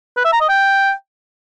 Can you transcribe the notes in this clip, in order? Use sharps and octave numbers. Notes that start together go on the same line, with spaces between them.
B4
E5
A#5
D#5
G5